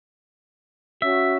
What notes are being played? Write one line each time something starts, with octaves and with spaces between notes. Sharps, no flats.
C#4 F#4 E5